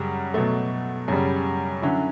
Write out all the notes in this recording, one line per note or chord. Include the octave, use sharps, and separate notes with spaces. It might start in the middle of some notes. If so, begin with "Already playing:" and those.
Already playing: F#2 C#3 G3
B2 F#3 A3
F#2 C#3 G3
D3 F#3 C#4 E4